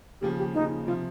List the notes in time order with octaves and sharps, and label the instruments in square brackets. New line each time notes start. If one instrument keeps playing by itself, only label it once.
[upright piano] D#2 C#3 F3 [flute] G4
[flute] G4
[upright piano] D#2 C#3 F3 [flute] D#4
[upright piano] C3 F3 [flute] F4